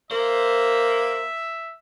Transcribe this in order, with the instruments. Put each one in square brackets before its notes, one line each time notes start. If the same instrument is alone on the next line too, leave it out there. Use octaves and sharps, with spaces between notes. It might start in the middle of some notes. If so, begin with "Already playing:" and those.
[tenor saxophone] A#3 [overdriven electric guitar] C5 [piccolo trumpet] E5